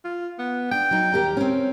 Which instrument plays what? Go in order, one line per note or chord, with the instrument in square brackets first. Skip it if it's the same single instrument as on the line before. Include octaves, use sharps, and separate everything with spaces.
[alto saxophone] F4
B3
[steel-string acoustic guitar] D4 [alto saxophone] G5
[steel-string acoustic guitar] F#3 D#4
D#2 G4 A#4
C4 C#4